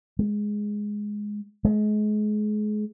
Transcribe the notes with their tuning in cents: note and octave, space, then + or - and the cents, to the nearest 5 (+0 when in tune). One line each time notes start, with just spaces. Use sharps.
G#3 +0
G#3 +30